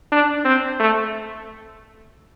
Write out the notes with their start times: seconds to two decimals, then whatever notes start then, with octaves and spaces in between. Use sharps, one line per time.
0.12 D4
0.45 C4
0.80 A3